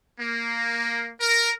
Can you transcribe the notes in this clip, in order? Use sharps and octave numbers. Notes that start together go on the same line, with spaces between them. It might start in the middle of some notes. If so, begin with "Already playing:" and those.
A#3
A#4